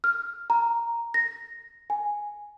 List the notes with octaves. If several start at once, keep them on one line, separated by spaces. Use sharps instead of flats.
F6
A#5
A#6
G#5